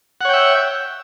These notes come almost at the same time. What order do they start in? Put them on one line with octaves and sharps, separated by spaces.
F#5 C#5 G5 E5